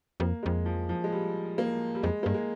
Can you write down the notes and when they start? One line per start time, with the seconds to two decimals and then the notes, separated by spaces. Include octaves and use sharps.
0.20 F2 A#3
0.43 F2 G#3
0.66 F3
0.89 F3
1.04 G#3
1.12 G3
1.58 A#3
1.95 G3
2.03 F2 G#3
2.23 G2 A#3
2.34 G#3